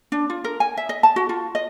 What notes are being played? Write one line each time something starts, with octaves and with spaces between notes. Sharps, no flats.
D4
F4
A#4
G#5
E5
D#5
A5
F#4
F4
D#5